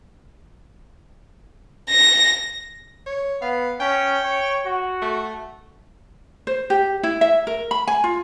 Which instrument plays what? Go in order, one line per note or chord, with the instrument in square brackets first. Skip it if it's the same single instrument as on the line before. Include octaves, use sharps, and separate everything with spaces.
[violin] A#6
[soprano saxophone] C#5
[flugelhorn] B3 [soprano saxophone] F5
[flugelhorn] C#4 [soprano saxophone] G5
[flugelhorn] C#5
F#4
[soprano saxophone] A3
[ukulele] C5
G4
E4
E5
A#4
B5
G#5
F4